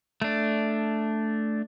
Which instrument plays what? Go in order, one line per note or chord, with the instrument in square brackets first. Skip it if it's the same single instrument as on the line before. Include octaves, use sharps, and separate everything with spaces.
[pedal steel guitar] A3 D4